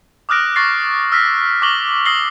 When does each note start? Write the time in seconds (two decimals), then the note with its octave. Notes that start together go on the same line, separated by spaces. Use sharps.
0.29 D6 D#6 F6 F#6 A#6 D7
0.56 C#6 A6 A#6 C7
1.12 E6 F6 A#6 B6
1.62 C#6 D6 F6 A#6 F#7 G7
2.05 D#6 E6 A#6 C7 F#7 G7